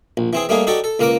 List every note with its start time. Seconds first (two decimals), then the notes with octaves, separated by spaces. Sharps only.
0.17 A#1
0.33 E3 C4 G#4
0.49 G3 A3 A#3 D#4 G#4
0.67 D#4 F#4 G4 A4 D5
0.84 A4
0.99 C#2 A#3 A#4 B4 D6